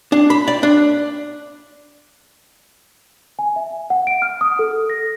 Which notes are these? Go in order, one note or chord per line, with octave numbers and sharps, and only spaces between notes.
D4
B5
D5
D4
G#5
E5
F#5
D7
F6
D#6
A4
A#6